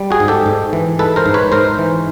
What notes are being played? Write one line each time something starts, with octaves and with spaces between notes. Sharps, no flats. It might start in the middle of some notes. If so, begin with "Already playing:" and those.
Already playing: G3
F#4 G#4
G#2
G4 A4
G#2
E3
G#3 A4 B4
A#4 C5
G#2
B4 C#5
G#2 A#4 C5
E3